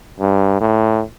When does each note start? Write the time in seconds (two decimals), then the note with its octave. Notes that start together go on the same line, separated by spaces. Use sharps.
0.20 G2
0.61 A2